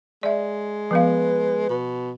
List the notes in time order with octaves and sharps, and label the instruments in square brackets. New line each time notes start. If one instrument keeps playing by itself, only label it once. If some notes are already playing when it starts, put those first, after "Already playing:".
[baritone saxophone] G#3 [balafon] D5 E5
[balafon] F3 B3 F5 [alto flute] B4
[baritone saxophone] B2